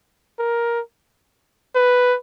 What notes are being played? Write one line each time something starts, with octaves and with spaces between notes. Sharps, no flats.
A#4
B4